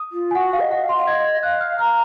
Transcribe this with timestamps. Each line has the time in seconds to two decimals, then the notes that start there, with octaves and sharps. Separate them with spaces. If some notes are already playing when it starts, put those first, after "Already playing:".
Already playing: D#6
0.12 F4
0.31 G#5
0.35 F#4 F#5
0.53 F5
0.60 D#5
0.71 F#5
0.84 F5
0.89 C6
0.97 F5
1.06 D#5 G#6
1.24 G#6
1.43 F5 F#6
1.60 F6
1.78 A#5 F6